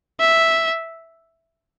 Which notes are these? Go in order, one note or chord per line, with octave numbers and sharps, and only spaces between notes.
E5